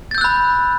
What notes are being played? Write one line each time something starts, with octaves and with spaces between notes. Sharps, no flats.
B5 E6 F#6 G6 A6